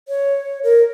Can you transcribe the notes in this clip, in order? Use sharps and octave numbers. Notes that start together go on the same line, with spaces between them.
C#5
A#4